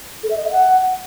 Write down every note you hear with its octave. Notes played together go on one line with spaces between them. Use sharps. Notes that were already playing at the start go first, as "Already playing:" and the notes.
A4
E5
D#5
E5
F#5